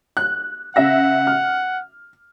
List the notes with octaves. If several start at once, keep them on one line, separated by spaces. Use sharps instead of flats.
F#6
C#3 E5 F#5 A#6
F6